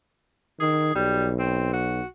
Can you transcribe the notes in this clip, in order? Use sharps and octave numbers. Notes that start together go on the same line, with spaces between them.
D#3 G#4
B1 G3
C4
F#4